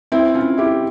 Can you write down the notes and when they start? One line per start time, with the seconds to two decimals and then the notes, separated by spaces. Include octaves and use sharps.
0.12 C4 E4
0.34 C#4 F4
0.57 E4 G4